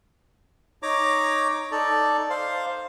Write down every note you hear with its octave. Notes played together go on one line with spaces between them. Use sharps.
D#4 C#5 A#5 D6
D#4 A4 D5
C5 F5